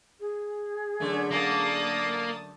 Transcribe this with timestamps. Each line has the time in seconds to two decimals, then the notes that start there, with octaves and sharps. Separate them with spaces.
0.20 G#4
1.00 F#2 D3 A3
1.32 A#3 A5 D#6